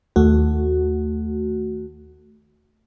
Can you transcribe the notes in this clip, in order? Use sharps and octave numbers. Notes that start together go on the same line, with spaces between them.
D#2 A3 F#4